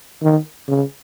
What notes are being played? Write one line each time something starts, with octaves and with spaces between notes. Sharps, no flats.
D#3
C#3